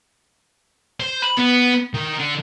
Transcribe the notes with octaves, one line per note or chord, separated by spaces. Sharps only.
C5
B5
B3
D#3
D3